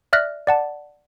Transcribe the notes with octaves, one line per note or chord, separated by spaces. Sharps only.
D5 E5 F6 F#6 A#6 B6
D5 F#5 A5